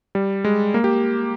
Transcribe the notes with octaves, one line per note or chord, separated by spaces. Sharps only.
G3
G#3
A#3
G4